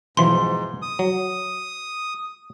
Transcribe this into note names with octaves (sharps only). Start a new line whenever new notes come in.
B1 G#2 E3 F3 C6
D#6
F#3